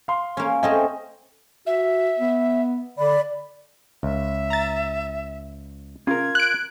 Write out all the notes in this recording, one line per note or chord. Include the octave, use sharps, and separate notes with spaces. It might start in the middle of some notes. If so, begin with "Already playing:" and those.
F5 C6
A#3 C#4
A3 C4 C#4 D#5 G5
F#4 E5
B3
D3 D5 B5
C#2 E5
A#5 A6
C#3 F4 A#4 G#6
F#6 D7